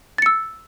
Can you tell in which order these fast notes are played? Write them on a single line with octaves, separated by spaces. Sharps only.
A6 C#7 E6